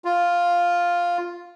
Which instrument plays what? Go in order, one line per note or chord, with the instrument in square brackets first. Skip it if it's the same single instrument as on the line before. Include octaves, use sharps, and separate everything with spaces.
[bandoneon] F4